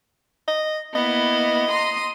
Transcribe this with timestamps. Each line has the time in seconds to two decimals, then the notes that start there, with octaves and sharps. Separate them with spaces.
0.48 D#5
0.95 A#3 B3 E4 D#5
1.69 A#5 C6 D#6